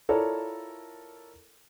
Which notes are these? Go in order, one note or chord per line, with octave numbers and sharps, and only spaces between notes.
E4 F4 A4 A#4 C#5 D5